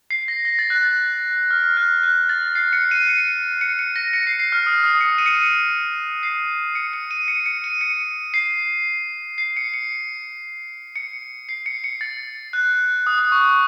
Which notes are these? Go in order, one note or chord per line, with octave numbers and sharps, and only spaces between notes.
C7
A#6
A#6
A6
F#6
A6
F6
F6
F#6
F#6
A6
C7
C#7
D#7
C#7
C#7
C#7
A#6
C#7
C7
C7
F6
D#6
D#6
C#7
D#7
C#7
D#7
C7
C#7
C#7
D#7
C#7
C#7
D#7
C#7
C7
C7
C#7
C#7
C#7
C7
C#7
C#7
A6
F#6
D#6
D#6
C#6